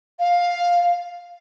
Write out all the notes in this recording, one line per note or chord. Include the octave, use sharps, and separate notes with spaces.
F5